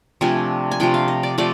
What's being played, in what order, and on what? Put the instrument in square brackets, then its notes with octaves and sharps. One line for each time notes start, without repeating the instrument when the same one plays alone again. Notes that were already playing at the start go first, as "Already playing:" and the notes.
[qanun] C3 F3 A3 D4 G#5
G#5
C3 F3 A3 D4 G5
F5
D#5
D5
C3 F3 A3 D5